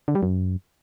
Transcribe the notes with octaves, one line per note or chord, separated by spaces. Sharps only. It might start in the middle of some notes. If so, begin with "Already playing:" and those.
D3
G3
F#2